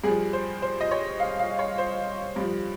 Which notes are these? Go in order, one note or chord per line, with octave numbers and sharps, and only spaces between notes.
G2 F3 G#4
C5
C5
D#5
C#5
F5
F5
C#5
C5
G2 F3